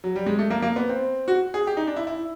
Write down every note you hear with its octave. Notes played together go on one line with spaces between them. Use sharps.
F#3
G3
G#3
A3
A#3
A#3
B3
C4
F#4
G#4
G4
D#4
D4
E4
E4